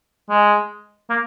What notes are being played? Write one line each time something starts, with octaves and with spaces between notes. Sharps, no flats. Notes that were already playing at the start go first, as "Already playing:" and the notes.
G#3
A#3